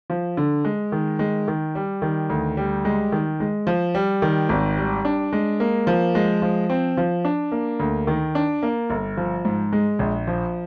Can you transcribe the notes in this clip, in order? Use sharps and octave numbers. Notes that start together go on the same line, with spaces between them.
F3
D3
G#3
D#3
G#3
D#3
G3
D#3
D2
G3
G#3
D#3
G#3
F3
G3
D#3
G#1
G3
D4
G#3
A#3
F3
G#3
F3
C4
F3
D4
A#3
D2
D#3
D4
A#3
G1
F3
G#2
G#3
A#1
F3